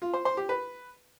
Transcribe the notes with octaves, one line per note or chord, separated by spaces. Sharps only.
F4
C5
C5
G4
B4